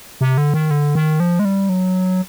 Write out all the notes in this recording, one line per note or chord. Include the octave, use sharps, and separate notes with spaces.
C3
D3
D#3
D3
D#3
F3
G#3
G3
F#3